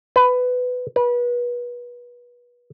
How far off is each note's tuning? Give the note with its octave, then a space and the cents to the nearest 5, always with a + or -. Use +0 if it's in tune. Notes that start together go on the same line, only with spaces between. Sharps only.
B4 +15
B4 -30